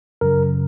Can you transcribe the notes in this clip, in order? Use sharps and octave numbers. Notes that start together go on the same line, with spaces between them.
F#2 C#3 F#3 A#4